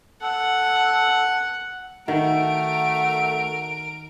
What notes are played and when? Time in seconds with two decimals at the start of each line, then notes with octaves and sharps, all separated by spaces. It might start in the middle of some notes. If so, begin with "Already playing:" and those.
0.22 A4 F#5
2.08 D#3 A3 F#4 A#4 D7